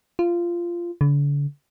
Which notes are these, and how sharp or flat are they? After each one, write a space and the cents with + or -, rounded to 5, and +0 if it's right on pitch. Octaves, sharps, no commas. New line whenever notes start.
F4 -15
D3 -40